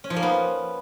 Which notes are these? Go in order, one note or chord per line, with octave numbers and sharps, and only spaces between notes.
C#4
F3
A#3
B3